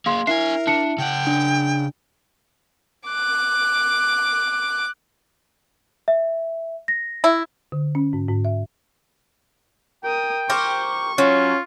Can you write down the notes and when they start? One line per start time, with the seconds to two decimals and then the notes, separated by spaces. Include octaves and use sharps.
0.06 A#3 G#4 F5 C6
0.27 D4 E4 A#4 E5 G#5 C7
0.67 D4 A5 C#7
0.98 C#3 F#5 G5
1.27 D4
3.09 D6 F#6
6.08 E5
6.88 A#6
7.24 E4
7.72 D3
7.95 C#4
8.13 G#2
8.29 G#2
8.45 E5
10.04 A#4 G5 D#6
10.50 G4 A#4 C5 C#6
11.18 F#3 C#4 F4